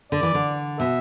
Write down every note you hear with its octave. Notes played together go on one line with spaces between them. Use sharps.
D3 D5
E3
D3
B2 E5